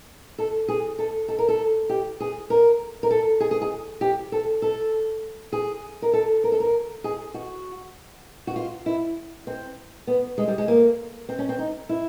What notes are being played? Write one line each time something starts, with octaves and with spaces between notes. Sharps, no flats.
A4
G#4
A4
A4
A#4
A4
G4
G#4
A#4
A#4
A4
G#4
G#4
G#4
G4
A4
A4
G#4
A#4
A4
A#4
A4
A#4
G#4
F#4
F#4
F4
E4
C4
B3
G#3
G3
G#3
A#3
C4
C#4
C4
D#4
E4